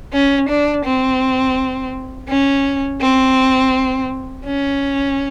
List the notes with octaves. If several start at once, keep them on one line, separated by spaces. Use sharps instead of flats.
C#4
D4
C4
C#4
C4
C#4